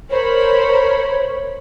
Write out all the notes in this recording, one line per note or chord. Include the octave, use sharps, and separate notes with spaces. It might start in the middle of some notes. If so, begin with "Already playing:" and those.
A#4 C5 C#5 B5